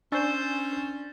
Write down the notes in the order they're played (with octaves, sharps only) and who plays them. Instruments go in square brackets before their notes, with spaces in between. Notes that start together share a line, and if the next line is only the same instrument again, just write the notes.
[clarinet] C#4 [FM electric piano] D4 A6 [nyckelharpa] C5 [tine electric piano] G#5 C#6 E6